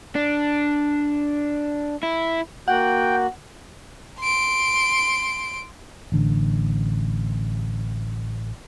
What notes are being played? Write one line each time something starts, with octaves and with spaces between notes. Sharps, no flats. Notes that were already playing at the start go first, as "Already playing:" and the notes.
D4
E4
A#3 F#4 F#5 G5
C6 D7
A1 D3